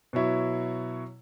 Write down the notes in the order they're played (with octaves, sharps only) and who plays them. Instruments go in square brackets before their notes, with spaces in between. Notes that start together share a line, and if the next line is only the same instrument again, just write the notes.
[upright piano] B2 F#3 E4 C#5